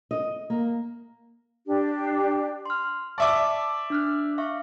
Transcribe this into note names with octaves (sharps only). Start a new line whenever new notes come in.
D#5
A#3
D4 G4
C6 F6
D5 E5 A5 C#6 D6
D4 F6 F#6
E5 F5 C#6